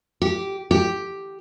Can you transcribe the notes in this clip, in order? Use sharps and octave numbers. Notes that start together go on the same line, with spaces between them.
G4
G4